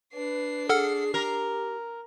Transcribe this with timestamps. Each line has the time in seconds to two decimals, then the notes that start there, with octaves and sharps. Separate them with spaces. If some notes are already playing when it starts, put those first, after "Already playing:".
0.13 D4 B4 C7
0.69 G#4 A4 F#5 F6
1.14 G4 A#4